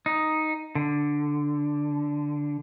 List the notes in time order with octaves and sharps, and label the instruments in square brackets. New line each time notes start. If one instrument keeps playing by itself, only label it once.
[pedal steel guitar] D#4
D3